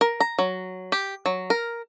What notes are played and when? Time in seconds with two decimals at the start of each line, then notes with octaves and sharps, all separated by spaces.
0.01 A#4
0.20 A#5
0.39 F#3
0.92 G4
1.26 F#3
1.50 A#4